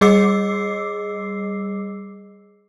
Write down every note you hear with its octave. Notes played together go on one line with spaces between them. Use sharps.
G3 G#4 D#5 D6 E6 C7